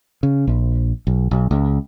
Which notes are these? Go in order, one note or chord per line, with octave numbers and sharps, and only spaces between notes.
C#3
A#1
B1
B1
C#2